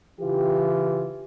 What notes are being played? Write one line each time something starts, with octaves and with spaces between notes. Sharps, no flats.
C#3 E3 F4 G4